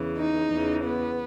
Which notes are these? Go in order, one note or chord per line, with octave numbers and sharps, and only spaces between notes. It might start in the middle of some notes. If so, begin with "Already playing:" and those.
Already playing: E2 C#3 E3
D#4
E2 C#3 E3
B3